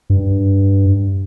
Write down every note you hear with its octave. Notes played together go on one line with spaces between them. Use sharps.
G2